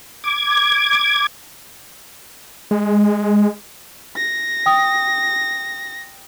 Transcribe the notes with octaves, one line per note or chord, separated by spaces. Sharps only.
D6 G#6
G#3
A#6
G5 D#6